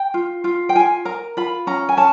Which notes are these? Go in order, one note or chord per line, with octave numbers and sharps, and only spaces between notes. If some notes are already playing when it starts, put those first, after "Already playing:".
Already playing: G5
F4
F4
G5
F4 G#5
A#4 A#5
F4 B5
C#4 A#5
G#5
C#4 A5